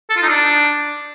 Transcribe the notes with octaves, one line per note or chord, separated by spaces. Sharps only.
A4
F4
D#4
D4